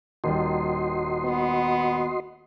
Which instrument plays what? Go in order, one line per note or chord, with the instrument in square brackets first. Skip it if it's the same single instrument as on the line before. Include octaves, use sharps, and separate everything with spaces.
[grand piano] D#1 D#3 G3 [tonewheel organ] F#4 D#5 C6
[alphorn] B3